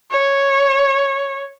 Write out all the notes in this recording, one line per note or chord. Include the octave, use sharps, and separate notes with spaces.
C#5